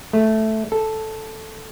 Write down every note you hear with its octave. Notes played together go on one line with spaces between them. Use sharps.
A3
A4